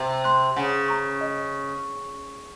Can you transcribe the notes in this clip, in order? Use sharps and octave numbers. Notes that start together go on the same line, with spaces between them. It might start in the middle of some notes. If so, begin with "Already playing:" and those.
Already playing: C3
C6 F#6
C#3 F#5
A#5 C#6
D#5